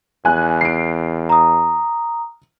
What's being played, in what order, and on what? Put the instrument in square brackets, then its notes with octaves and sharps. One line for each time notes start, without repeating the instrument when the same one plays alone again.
[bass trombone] E2 [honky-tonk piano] G#5 F#6
[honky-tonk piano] C7 D7
[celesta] A#5 D#6